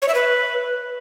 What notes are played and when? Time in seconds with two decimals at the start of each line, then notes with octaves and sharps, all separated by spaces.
0.02 C#5
0.08 E5
0.15 B4